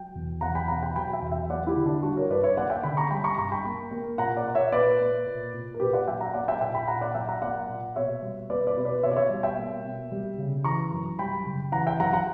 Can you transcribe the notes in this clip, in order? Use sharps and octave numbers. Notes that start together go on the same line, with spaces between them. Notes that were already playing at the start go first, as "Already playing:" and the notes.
Already playing: F#3 G5
E2
E2 F#5 A#5
G5 B5
B2 F#5 A#5
G5 B5
F#3 G5 B5
E5 G5
E2
E5 G5
A#3 D5 F#5
E4 G4
D3
D4
G3 D4 F#4
A#4 C#5
G2 B4 D5
C#5 E5
A#3 D5 F#5
E5 G5
D3 G5 B5
A#5 C#6
G3 G5 B5
A#5 C#6
G2 A#5 C#6
G5 B5
A#3
A#3
A#2 F#5 A#5
D5 F#5
A#2
C#5 E5
A#3 B4 D5
A#3
A#2
A#2
A#4
A#2 G4 B4
D5 F#5
F#3 E5 G5
F#5 A#5
A#3 D5 F#5
E5 G5
A#2 E5 G5
G5 B5
A#2 F#5 A#5
D5 F#5
F#3 E5 G5
F#5 A#5
A#3 D5 F#5
A#2
B2 C#5 E5
G3
A#3 B4 D5
B4 D5
B2
B4 D5
B2 C#5 E5
D5
C#5 E5
G3
E5 G5
A#3
B2
G3
C#3
E3 A#5 C#6
F#2
G3 G5 B5
C#3
E3 F#5 A#5
E5 G5
F#2 F#5 A#5
F#5 A#5